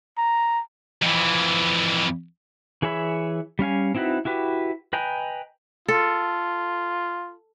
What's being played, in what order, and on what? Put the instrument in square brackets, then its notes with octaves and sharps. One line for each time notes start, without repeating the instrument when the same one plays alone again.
[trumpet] A#5
[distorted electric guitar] F2 E3
[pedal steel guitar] E3 G#4 C#5 E5 B5
G3 C#4 F5 G#5
C4 D#4 E4 F#4 B4
E4 F#4 G4 B4
B4 D#5 G5 G#5 A#5
[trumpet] F4 [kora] A4